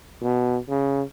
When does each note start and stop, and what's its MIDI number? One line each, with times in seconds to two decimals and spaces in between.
0.22 0.57 47
0.69 1.02 49